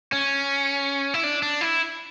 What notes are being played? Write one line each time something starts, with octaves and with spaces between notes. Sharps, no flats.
C#4
E4
D4
D4
E4